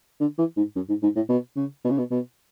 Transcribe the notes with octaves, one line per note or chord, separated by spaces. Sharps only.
D3
E3
G#2
F#2
G#2
G#2
A2
B2
C#3
B2
C#3
B2
B2